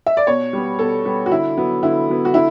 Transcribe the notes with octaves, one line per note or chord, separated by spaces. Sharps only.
E5
D5
B2 C#5
G3 B3
B2 A4
G3 B3
F#4
D3 E4
F#3 B3
D3 E4
F#3 B3
F#4
D3 E4